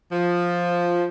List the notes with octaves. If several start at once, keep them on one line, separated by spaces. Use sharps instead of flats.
F3